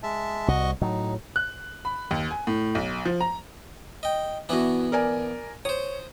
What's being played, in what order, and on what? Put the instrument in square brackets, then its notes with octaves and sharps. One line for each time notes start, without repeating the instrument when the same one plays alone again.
[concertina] G#3 E5 A5
[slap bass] C2 [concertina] F#4 D#5 C#6
[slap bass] A2 F#3 [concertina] D#4
[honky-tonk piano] F#6
B5
D#2
G#5
A2
B1
F3
A#5
[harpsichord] D#5 G5
[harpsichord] E3 B3 D4 [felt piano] E4 F#4
[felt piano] A#4 D5 G#5
[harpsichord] C5 D#6 [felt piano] C#5